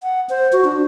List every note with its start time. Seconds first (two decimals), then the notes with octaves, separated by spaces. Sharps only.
0.03 F#5
0.29 C5
0.53 F#4
0.65 D4